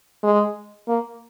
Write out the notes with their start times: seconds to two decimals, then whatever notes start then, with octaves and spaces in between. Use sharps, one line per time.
0.23 G#3
0.88 A#3